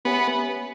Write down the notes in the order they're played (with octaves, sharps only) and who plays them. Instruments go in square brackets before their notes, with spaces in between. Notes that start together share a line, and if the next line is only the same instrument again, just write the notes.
[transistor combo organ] B3 [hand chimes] C#4 G4 C#5 E5 G#5